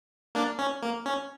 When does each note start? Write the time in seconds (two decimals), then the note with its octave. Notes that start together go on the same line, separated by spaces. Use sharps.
0.35 A#3 D4
0.59 C#4
0.82 A#3
1.06 C#4